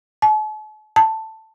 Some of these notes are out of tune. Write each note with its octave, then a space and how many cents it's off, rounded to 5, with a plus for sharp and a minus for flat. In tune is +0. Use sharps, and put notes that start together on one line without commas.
A5 -45
A5 +5